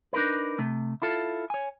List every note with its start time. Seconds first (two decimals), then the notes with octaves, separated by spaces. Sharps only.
0.13 D4 D#4 A#4 B4
0.59 C3 A3
1.02 E4 F4 A4
1.50 C#5 G#5